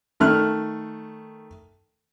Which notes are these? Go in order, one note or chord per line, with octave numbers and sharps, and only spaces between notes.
D#3 A3 F6 F#6